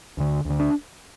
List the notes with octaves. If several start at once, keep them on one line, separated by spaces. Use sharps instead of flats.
D2 D3
D2 D3
D4